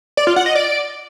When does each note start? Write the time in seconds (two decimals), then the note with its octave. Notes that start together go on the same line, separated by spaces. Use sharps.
0.17 D5
0.27 F4
0.36 F#5
0.46 D#5
0.55 D5